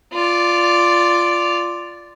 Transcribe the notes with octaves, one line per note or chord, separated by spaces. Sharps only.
F4 D5